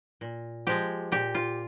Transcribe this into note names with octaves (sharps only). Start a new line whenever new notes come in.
A#2
F3 G#3 G4
A#2 G4
F4